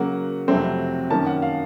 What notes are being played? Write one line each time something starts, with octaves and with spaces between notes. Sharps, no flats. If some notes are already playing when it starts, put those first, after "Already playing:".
Already playing: C#3 F#3 A#3 F#5
F2 C3 F#3 A3 C4
F#2 D#3 A#3 C#4 A5
F#5
F5